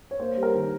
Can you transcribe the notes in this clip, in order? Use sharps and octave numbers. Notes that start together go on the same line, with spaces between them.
C#5
A#3 C5
G3
A#4
D#3